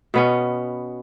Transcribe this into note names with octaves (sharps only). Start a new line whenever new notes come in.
B2 B3 C#4